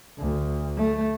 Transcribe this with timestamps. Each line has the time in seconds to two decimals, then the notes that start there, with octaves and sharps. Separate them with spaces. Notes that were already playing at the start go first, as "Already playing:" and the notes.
0.18 D2
0.77 A3